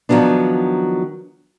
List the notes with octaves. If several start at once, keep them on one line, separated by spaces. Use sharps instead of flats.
D#3 F3 F#3 B3 D4